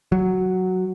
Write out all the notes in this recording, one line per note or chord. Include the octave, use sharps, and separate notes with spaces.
F#3